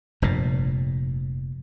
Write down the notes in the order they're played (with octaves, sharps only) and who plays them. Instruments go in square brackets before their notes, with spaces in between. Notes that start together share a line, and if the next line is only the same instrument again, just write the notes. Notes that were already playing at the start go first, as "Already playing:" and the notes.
[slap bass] F1 G2 A#2